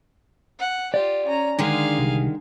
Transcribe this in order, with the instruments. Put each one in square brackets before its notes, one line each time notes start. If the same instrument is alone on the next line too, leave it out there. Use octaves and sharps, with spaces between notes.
[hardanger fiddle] F#5
[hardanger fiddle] F4 G4 [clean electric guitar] D5
[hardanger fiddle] C#4 A#5
[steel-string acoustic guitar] D3 D#3 G#3 [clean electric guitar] D4 [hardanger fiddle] G#4 F5
[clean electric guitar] C2